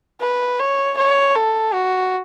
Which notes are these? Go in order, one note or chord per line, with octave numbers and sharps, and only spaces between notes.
B4
C#5
C#5
A4
F#4